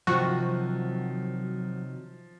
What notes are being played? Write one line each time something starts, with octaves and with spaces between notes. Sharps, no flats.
C3 D#3 F3 F#3 F#4